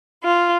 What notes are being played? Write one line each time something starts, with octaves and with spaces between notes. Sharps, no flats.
F4